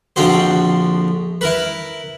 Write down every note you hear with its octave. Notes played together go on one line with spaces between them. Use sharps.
A#1 D3 F3 C4 F#4 C5
E4 A#4 B4